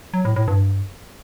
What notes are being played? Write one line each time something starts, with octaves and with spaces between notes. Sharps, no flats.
F#3
A2
A2
G2